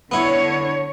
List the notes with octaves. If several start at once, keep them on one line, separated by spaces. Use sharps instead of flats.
D3 B3 E4 C#5